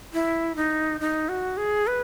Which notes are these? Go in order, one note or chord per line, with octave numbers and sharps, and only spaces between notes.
E4
D#4
D#4
F#4
G#4
B4